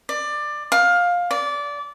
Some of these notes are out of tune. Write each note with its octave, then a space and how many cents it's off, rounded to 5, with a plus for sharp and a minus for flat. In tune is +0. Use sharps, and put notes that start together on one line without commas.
D5 +20
F5 +15
D5 -20